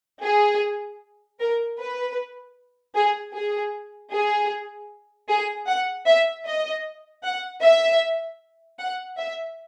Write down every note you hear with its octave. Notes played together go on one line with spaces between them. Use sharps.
G#4
A#4
B4
G#4
G#4
G#4
G#4
F#5
E5
D#5
F#5
E5
F#5
E5